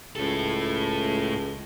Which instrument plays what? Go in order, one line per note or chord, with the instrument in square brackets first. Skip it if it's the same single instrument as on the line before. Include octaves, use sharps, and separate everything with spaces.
[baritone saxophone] C#2 [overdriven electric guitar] A2 A4